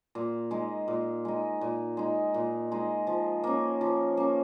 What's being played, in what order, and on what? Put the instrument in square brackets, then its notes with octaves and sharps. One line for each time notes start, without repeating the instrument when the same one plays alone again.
[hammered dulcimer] A#2
G#3 D#4
A#2
G#3 D#4
A#2
G#3 D#4
A#2
G#3 D#4
F3
A#3 C#4
F3
A#3 C#4